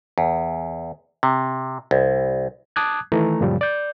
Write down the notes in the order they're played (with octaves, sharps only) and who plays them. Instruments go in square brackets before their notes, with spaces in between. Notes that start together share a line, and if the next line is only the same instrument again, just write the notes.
[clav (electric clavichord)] E2
C3
C2
[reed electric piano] A5 D6 D#6 F#6 G#6
D#3 E3 A3 A#5
F#2 A#2 C#3 F3 G3
D5 G6